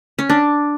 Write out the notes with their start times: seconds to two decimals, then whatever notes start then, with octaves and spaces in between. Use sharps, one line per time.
0.19 C#4
0.30 D4